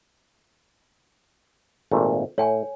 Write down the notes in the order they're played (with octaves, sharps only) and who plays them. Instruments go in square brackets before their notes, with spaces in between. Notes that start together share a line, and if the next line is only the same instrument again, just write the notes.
[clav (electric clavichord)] G#1 A#2 A3
[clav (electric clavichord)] A2 [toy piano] C#5 G5 G#5